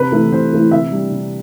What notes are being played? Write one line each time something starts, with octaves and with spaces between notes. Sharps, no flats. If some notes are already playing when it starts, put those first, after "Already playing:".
Already playing: C3 B4
E3 A3 E4
C3 C5
E3 A3 E4
C3 E5
G3 D4
C3